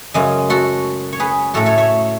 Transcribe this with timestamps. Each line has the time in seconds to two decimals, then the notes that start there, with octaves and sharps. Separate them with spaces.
0.14 F#2 C#3 G#3
0.50 F#4 A4
1.13 C#5
1.20 G#4 B4
1.54 A2 F#3 A3 F#4 A4
1.66 A4 C#5
1.78 C#5 E5